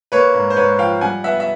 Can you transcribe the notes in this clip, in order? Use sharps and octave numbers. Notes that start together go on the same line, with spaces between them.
A#3 B4 C#5
G#2
C5
G#2 B4 C#5
F3 F5 G5
G3 F#5 G#5
B3 E5 F#5
E5